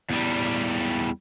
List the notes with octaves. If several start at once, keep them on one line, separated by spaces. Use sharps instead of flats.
E2 G3